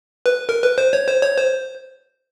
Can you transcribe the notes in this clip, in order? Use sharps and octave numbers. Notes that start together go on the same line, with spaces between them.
B4
A#4
B4
C5
C#5
C5
C#5
C5